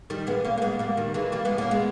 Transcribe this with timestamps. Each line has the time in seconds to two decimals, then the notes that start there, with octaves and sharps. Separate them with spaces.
0.10 D#3 G3
0.27 G#3 B3
0.45 A#3 C#4
0.58 A#3
0.62 G#3 B3
0.79 G3 A#3
0.97 D#3 G3
1.14 E3 G#3
1.32 G3 A#3
1.45 G#3 B3
1.58 A#3 C#4
1.71 G#3 B3